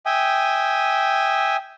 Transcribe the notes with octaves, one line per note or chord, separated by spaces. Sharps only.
E5 G5 G#5 D#6